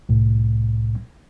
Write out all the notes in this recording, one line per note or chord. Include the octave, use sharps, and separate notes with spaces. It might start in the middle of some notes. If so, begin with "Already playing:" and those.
C2 A2